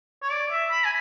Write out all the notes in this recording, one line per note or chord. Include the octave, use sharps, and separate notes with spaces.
C#5
D5
E5
B5
G#5